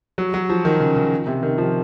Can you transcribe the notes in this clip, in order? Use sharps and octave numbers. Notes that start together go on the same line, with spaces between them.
F#3
F#3
F3
D#3
C#3
C#3
C3
D#3
F3